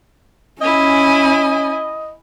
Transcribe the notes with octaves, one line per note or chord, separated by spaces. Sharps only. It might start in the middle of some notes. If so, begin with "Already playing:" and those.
C#4 E4 D#5 G#5